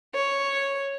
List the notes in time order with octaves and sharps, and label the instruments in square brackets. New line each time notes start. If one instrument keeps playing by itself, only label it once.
[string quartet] C#5